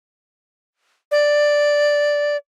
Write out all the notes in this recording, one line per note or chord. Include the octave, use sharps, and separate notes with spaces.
D5